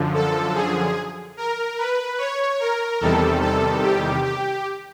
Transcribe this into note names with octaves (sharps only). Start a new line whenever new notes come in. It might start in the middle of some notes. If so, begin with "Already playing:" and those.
Already playing: F#2 D3 F3
A4
G#4
A#4
B4
C#5
A#4
E2 C3 D#3 G3 A4
A4
G4
G4